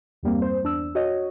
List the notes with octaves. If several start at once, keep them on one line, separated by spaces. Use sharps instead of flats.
E2 G2 G3 A#3 C4
C5
E2 D4 E6
F#4 C#5 D#5